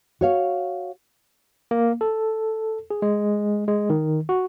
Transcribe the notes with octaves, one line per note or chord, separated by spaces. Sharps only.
F#4 C#5 F5
A#3
A4
G#4
G#3
G#3
D#3
F#4